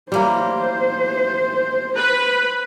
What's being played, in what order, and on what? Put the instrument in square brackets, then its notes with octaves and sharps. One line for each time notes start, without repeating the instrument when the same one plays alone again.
[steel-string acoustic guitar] A2 E3 F#3 [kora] G3 A#3 [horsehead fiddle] C5
[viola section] B4